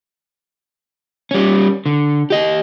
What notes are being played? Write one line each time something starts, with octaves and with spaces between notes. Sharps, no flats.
G3 C#4
D3
G4 D#5